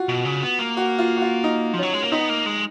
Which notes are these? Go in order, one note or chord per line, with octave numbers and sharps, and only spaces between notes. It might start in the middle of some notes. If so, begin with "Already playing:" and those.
Already playing: F4 F#4
B2
C#3
B3
A#3
F#4
F4
F#4
F4
D#4
F3
F#3 C#4
G#3
A#3
B3 D#4
A#3
G#3